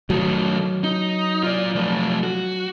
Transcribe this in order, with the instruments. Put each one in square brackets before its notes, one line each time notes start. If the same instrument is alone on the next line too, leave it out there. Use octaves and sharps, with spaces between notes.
[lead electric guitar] D#3 A3 [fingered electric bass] F#3
[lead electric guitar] D#4
F4 D5
F3 A3
F#4